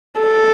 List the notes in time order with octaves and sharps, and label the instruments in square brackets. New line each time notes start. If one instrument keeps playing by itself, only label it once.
[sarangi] A4